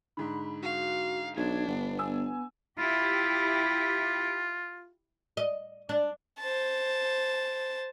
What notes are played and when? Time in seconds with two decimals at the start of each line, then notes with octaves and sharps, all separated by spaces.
0.17 G#2 D3 B5
0.63 F#4 F5
1.37 B1 D4 G#6
1.68 G1 B3
1.99 G#5 E6
2.79 E4 F4 G4
5.37 D#5
5.89 D4
6.39 C5 A5